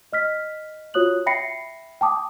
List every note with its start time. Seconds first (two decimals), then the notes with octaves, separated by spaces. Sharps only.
0.13 D#5 F6 B6
0.94 F4 F#4 C#5 D#6 F#6 F#7
1.26 E5 G5 B5 A#6 C7 C#7
2.01 G5 A5 D6 D#6